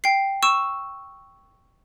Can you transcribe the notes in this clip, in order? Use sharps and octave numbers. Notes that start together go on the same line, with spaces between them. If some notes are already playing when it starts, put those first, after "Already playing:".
G5 C7
C#6 E6 E7